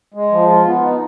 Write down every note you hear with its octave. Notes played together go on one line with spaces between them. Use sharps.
G#3
F3
F4
B3
D#4